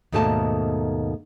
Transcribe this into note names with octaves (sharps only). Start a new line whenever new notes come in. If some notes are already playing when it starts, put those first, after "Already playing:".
D#2 G#2 B2 A3 A#3 A5